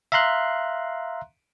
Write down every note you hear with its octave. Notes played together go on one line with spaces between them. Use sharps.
E5 F5 A#5 C6 F#6